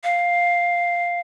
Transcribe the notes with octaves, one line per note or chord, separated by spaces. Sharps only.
F5